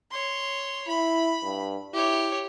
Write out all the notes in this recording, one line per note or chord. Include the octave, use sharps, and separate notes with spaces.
C#5 C6
E4 B5
G2
E4 G4 C#5